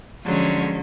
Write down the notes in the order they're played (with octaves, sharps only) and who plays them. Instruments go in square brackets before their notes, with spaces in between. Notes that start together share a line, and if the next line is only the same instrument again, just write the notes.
[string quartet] D3 F#3 [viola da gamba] F3 G#3 C#4